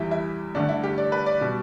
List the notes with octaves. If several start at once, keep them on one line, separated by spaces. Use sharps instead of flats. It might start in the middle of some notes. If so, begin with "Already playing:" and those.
Already playing: E2 E3 G3 E4 G4
E4
G2 D3 A3 D4
E4
G4
D5
B4
D5
B2 G3